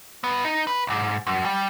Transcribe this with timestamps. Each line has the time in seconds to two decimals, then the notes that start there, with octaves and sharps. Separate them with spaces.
0.24 G2 B3
0.45 D#4
0.67 B4
0.87 B1 G#2
1.27 F#2
1.45 G3